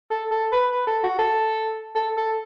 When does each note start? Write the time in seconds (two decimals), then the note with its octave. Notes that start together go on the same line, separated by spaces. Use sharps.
0.11 A4
0.31 A4
0.52 B4
0.72 B4
0.87 A4
1.04 F#4
1.19 A4
1.95 A4
2.17 A4